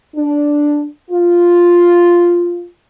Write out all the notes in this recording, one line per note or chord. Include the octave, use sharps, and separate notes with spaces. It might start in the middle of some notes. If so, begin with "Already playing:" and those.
D4
F4